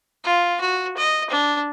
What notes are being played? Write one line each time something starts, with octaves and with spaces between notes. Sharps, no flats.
F4
F#4
D#5
D4